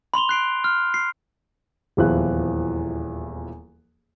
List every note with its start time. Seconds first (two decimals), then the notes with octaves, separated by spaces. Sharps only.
0.14 B5 C6 F7 G7
0.29 F#6 C7 D7
0.64 F6
0.94 C7
1.97 D#1 E2 E3 F3 F#6